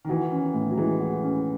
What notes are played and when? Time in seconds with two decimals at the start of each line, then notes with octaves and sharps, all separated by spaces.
0.05 D#3
0.09 E3 F#4
0.32 C#4
0.54 A2
0.70 F#3
0.77 E3 G#3
1.00 F#4
1.23 C#4